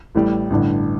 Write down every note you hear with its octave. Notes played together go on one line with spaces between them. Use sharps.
A1 A2 G3
A1 G2 D3